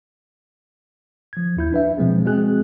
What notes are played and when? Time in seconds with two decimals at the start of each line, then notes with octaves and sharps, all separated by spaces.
1.33 F3 G#6
1.57 D#2 E4 G6
1.72 D4 B4 E5
1.97 B2 F3 G#3 C4 G#4
2.25 G#3 C4 F#4 G#4 F#6